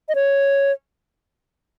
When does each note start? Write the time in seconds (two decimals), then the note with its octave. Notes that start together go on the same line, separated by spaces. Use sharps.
0.09 D#5
0.15 C#5